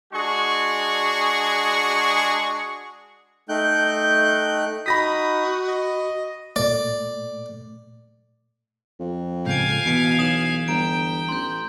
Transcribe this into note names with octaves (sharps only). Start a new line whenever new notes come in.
G#3 D4 F#4 G#4 C#6
A3 D#4 G5 F#6 G6
D#4 F#4 B5 D#6 A#6 B6
D#5
A#2 A3 D5
F2
A2 C#3 G#3 F5 G#5 G6 D7
B2 E3 B6 C#7 D7
B1 D#6 E7 F#7
G1 G5 A#5 D7
A1 C6 G6